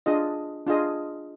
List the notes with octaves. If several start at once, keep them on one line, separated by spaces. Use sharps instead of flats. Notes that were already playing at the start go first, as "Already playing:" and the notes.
D4 F4 G#4 D#5
D4 F4 G#4 D#5